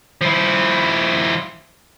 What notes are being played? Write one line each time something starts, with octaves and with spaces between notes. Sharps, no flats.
F3 E4